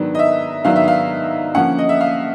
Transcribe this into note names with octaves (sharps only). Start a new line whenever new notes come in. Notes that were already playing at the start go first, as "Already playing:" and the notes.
Already playing: G#2 D#3 F#3 B3 D4
D#5
E5
G#2 D#3 F#3 B3 D4 F5
E5
F5
D3 F3 A#3 C#4 F#5
D#5
E5
F5